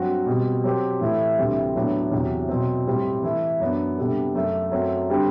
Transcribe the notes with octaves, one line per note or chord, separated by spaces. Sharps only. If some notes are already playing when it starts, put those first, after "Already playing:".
Already playing: G2 F#3 C4 F#4
B2 G3 C4
F#3 C4 G4 C5
A2 E3 A3 E4
D2 C3 E3 G3 C4
A2 F#3 B3 D4
E2 C3 F#3
B2 F#3 C4
A2 G3 C4
E3 A3 E4 A4
F#2 F#3 B3 D4
C3 G3 B3 D4 A4
F#2 F#3 A3
F#2 F#3 A3 C4
D3 G3 C4